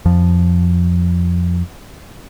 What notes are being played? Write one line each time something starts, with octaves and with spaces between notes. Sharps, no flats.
F2 F3